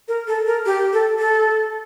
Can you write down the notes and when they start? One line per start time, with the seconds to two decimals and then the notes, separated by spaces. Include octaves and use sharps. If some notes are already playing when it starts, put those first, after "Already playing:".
0.08 A#4
0.27 A4
0.47 A#4
0.66 G4
0.93 A4
1.19 A4